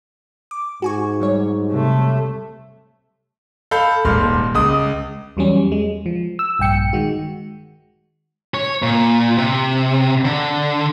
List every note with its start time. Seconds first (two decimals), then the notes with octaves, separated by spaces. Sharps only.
0.51 D6
0.82 G#2 F#4 G#5 C#6
1.20 F#3 G3 C#5
1.71 C3 A3
3.71 A4 F5 B5 G6
4.05 D#1 G#2 C6 F6
4.55 C#2 D#6
5.37 E2 F#3 G3 C#4
5.72 G#3
6.06 F3
6.39 E6
6.59 A#1 G2 G5 C#7
6.93 D#3 G#3 F#4
8.54 C#5
8.83 A#2
9.38 C3
10.25 D3